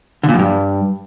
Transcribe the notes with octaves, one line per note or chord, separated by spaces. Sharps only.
D3
A#2
F#2
G2